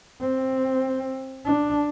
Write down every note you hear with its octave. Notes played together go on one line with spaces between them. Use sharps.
C4
D4